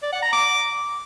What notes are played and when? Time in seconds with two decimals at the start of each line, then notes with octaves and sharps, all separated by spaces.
0.03 D5
0.13 F#5
0.23 A#5
0.32 D6